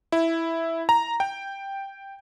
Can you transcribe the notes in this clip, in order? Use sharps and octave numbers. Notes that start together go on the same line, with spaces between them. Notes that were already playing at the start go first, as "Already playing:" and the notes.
E4
A#5
G5